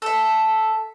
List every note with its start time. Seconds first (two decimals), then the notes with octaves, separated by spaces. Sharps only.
0.02 A4 E5